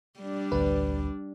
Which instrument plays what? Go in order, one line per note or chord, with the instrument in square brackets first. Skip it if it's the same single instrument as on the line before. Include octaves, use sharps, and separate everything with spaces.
[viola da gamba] G3 D4
[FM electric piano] A1 D2 B4